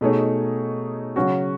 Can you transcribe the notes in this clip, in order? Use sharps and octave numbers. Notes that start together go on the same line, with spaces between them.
B2 A3 D#4 G#4 C#5
C#3 F#3 C#4 F#4